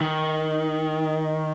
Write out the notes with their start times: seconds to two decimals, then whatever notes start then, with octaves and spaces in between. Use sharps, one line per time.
0.01 D#3